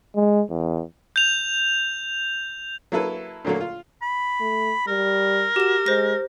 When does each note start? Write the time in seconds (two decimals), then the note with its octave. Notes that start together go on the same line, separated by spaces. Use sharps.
0.15 G#3
0.50 E2
1.16 G6 F7
2.92 F#3 A#3 E4 A4 B4
3.45 A#2 D3 F#3 A3 A#3
3.60 F4
4.02 B5
4.40 A3
4.87 G3 A#4
5.56 F#4 G4 E7
5.86 G#3 C5 A#6